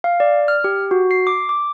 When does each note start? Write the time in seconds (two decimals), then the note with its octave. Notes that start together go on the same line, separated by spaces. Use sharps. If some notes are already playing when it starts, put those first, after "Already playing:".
0.04 F5
0.20 D5
0.48 F6
0.64 G4
0.91 F#4
1.11 C7
1.27 D6
1.49 D6